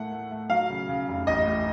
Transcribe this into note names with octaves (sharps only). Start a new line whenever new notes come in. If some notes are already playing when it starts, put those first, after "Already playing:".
Already playing: A2 A3 A#3 F#5
A3
A3
F#3 F5
C#3
C#3
F1
A1 D#5
A2